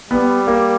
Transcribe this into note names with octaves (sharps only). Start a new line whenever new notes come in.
G3 B3
A#3